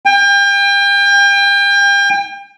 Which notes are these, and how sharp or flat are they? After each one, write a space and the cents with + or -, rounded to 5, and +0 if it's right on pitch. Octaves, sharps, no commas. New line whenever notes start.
G5 +35